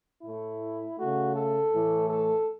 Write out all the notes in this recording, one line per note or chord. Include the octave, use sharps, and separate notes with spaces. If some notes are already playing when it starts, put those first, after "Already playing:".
A2 A3 E4
C#3 A3 F#4
A4
A2 E3 A3
A4